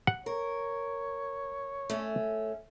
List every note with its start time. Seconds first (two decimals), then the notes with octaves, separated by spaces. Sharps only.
0.07 F#5
0.26 A#4 C#5
1.90 A3 C#4